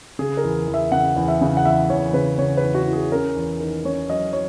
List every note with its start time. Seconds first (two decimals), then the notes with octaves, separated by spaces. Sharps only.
0.19 C#3 G#4
0.37 A#4
0.44 E2
0.68 E2
0.74 E5
0.92 C#3 F#5
1.16 E2
1.28 E5
1.41 C#3
1.57 F#5
1.65 E2 E5
1.90 E2 C#5
2.13 C#3 B4
2.38 C#3 C#5
2.57 B4
2.63 E2
2.75 F#4
2.87 E3
2.93 G#4
3.12 C#4 A#4
3.36 E2
3.60 D#3
3.85 C#4 C#5
4.09 F#3 D#5
4.33 F#3 C#5